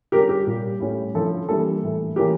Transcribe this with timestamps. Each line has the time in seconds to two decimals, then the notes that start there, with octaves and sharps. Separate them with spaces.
0.12 D3 G3 C#4 G4 A#4
0.29 G4
0.47 A#2 G3 A#3
0.80 A2 G3 C#4 E4
1.14 D3 F3 C#4 E4 A4
1.48 E3 G3 A#3 D4 A4
1.83 A2 E3 A3
2.16 E3 A#3 C#4 E4 G4 A#4